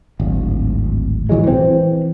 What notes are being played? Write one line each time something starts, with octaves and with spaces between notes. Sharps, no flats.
D1 G#1
A#1 E3 F#3 G#3
E3 C4